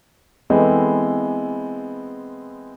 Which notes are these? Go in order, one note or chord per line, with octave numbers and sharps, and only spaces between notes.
E3 G#3 B3 C4 A4